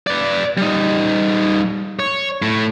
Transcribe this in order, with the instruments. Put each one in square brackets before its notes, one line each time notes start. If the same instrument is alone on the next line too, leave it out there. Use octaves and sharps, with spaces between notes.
[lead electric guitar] B4 D5
G3 D#4
C#5
A2